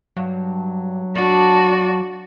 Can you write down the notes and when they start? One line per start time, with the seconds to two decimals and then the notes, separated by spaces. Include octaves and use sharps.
0.17 G2 F#3
1.15 F2 D4 F#4 D5